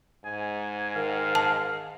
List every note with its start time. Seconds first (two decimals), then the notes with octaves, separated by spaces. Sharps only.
0.24 G#2 G#5
0.95 D#3 F5
1.35 A5